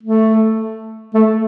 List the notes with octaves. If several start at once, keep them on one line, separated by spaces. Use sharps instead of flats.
A3
A3